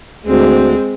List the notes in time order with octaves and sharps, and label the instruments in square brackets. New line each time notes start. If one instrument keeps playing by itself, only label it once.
[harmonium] D2 [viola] G#3 C4